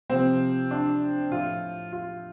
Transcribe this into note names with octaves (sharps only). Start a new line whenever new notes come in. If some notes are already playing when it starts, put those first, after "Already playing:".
C3 F3 C4
D4
A2 F3 F4
F4